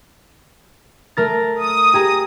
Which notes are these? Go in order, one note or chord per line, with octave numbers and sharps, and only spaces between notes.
A3 A#4 A6
D#6
G4 G#4 A#5